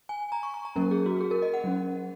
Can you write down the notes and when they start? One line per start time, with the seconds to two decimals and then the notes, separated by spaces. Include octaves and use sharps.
0.09 G#5
0.32 A#5
0.43 C#6
0.54 C#6
0.65 A#5
0.76 F#3 A#3 C#4 A#4
0.91 G#4
1.06 F#4
1.21 G#4
1.31 A#4
1.42 D#5
1.54 F#5
1.64 F#3 C#4